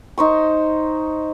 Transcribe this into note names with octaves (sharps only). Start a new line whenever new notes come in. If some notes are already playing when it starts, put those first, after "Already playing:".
D#4 C5 C#6